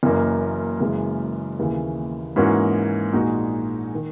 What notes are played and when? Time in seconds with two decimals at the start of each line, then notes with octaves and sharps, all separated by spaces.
0.03 F#1 F#2 E3 A#3
0.80 F#1 F#2 C#3 E3 G#3
1.59 D#2 C#3 E3
2.36 G#2 E3 A#3 C#4 F#4
3.13 A#1 A#2 G#3 D#4 F#4
3.95 D#3